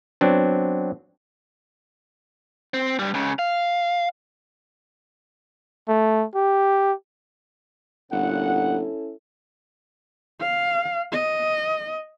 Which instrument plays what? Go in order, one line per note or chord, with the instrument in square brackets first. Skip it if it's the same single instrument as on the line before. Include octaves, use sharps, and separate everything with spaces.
[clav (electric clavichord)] F#3 B3 C4 D4
[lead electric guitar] C4
G2 G3
C#2 C#3
F5
[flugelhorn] A3
G4
[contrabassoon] G1 [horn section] A#2 F#5 [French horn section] C#4 E4 A4
[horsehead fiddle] F5
D#5